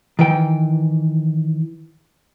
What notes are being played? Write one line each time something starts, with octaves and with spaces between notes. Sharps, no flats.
D#3 E3 G5